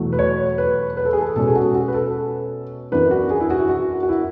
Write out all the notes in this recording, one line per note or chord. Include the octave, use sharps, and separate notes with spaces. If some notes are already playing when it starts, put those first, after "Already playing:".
Already playing: E2 B2 F#3 A3
B4
C#5
B4
B4
A4
G#4
A4
B2 G#3 C#4 A4
G#4
F#4
F#4
B4
A4
F#2 E3 B3 D4 B4
F#4
G#4
E4
F#4
F#4
F#4
E4